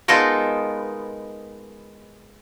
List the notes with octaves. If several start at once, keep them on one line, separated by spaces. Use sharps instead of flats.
G#3 B3 D#4 F4 A4 A#4